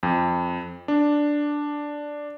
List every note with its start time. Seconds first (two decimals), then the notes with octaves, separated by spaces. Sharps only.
0.03 F2
0.88 D4